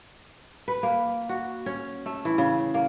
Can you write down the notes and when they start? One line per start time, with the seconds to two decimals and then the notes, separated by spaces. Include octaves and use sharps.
0.68 B4
0.83 A#3
1.29 F#4
1.66 C#4
2.06 A3
2.25 E3
2.38 C#3
2.74 A#3